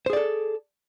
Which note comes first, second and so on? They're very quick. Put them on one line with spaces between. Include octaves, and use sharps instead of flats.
C5 G#4 D5 A4